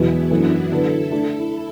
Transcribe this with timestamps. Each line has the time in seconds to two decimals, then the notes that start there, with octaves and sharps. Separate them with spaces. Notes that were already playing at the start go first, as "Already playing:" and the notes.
Already playing: E1 E2 B2 F#3 B3 E4
0.31 F#2 E3 A3 D4 F#4
0.71 D3 F#3 D4 E4 A4 B4
1.12 A3 D4